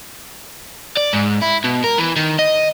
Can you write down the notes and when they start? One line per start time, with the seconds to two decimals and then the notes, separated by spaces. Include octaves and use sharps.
0.97 D5
1.13 G#2
1.42 E4
1.64 B2
1.84 A#4
1.98 E3
2.16 D#3
2.39 D#5